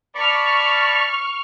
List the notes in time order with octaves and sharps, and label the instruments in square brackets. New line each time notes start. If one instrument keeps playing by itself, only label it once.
[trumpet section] D5 A5 B5 [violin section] C#6 F6